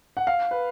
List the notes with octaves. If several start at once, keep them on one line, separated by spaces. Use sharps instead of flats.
F#5
F5
B4